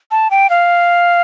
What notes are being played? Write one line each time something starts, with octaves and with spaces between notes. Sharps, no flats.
A5
G5
F5